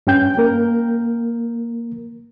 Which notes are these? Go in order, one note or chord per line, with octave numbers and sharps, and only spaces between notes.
G2 C#4 G5 G6
A#3 A#4